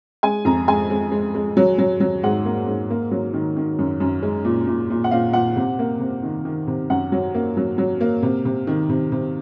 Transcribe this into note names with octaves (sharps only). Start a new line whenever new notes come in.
G#3 G#5
F2 A#5
G#3 G#5
G#3
G#3
G#3
F#3
F#3
F#3
G#2 F#5
A#3
G#2
A#3
F#3
D#3
D#3
F#2
F#2
G#3
A#2
A#2
A#2
F#5
A#2 F5
A#2 F#5
C3
A#3
C3
D#3
D#3
C3
F#2 F#5
F#3
A#3
F#3
F#3
A#3
C3
C3
D#3
C3
C3